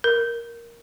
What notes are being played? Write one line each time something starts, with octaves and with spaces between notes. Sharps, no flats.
A#4